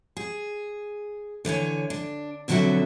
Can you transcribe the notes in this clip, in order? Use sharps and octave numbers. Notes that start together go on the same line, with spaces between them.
G#4
D3 E3 C#5 G#5
D4
F2 B2 D3 F#3 F#4 E5